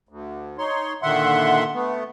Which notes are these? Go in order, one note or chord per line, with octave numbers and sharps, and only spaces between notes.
D2
D#4 C#5 C6
A#2 D3 D#3 E5 F#5 C6
A3 B3